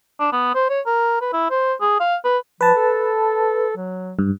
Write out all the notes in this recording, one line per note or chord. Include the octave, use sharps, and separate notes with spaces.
D4
B3
C5
C#5
A#4
B4
E4
C5
G#4
F5
B4
F3 B4 A5
A4
F#3
G2